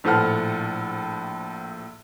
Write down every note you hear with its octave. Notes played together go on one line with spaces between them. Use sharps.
A#1 A2 F3 A4 F#5 F6